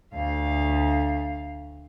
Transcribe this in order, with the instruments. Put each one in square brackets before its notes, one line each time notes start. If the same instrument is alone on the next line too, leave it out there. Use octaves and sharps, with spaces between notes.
[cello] D2 F5